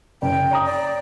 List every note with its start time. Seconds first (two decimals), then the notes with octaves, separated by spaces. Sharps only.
0.22 F#1 G5
0.51 C#5 A#5 D#6
0.65 D5